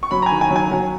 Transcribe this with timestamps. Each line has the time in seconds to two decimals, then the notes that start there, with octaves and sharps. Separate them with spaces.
0.03 C#6
0.11 F#3 B5
0.22 A#5
0.26 G#5
0.32 D#3
0.41 G#5
0.51 F#3
0.56 G#5
0.71 F#3